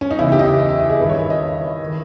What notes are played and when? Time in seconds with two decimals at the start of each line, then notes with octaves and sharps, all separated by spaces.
0.01 C#4
0.11 D#4
0.19 E2 C#3 E3 E4
0.32 G4
0.39 D#5
0.46 E5
0.60 D#5
0.69 E5
0.80 D#5
0.90 G#4
1.00 G2 D#3 B4
1.09 C#5
1.20 E5
1.30 D#5
1.85 D#3